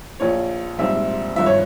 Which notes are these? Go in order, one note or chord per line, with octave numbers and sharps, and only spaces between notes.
A#1 A#2 F3 C#5
A#1 G#2 G3 C4 E5
G#1 G2 F3 E5
C#5